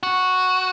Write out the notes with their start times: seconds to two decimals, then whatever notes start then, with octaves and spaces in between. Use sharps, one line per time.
0.03 F#4